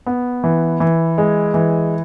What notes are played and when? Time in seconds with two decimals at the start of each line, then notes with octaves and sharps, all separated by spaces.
0.06 B3
0.44 E3
0.80 E3
1.18 G#3
1.54 E3